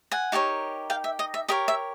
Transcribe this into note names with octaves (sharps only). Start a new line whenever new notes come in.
F#5 G#5
D#4 G4 A#4 C#5
F5 G5
E5
D#5
E5
G4 A#4 C#5 D#5
E5